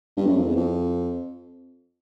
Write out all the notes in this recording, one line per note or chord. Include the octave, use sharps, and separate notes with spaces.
G2
F#2
F2
E2
F2